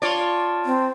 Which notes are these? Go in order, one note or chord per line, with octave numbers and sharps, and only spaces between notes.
F4 C#5 D5 A5
C4